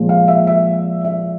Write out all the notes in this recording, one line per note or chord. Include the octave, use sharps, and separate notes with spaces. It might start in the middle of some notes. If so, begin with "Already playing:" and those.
Already playing: A#2 F3 G#3
F5
E5
E5
E5